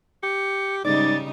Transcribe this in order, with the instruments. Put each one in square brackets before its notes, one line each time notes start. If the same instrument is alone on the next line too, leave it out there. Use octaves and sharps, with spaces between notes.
[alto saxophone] G4 [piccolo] C#7
[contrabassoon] G#2 [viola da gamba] C#3 G3 D#4 [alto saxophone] D5 [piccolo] A6